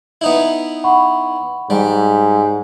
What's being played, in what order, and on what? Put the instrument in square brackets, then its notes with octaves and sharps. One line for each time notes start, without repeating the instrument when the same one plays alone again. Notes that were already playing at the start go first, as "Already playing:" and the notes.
[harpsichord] B3 D#4 E4
[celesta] F#5 B5 C#6
[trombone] G#2 [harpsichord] G3